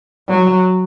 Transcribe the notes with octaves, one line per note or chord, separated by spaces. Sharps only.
F#3